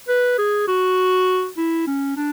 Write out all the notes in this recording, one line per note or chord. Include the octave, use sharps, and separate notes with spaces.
B4
G#4
F#4
E4
C#4
D4